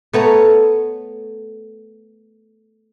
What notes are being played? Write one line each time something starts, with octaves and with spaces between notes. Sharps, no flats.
A3 B3 C#5 A#5